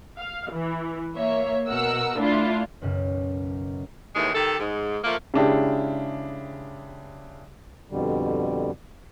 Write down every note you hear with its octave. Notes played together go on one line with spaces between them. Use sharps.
F5
E3
A#3 C#5 E5
B2 A#4 F#5 E6
A3 D4 E4 F4
B1 F#2 C#3
D#2 A2 D#3 E3 G#3
D#3 G4 A4
G#2
F3 A3 A#3
C#3 G#3 D4 E4 G4
F2 B2 D3 G3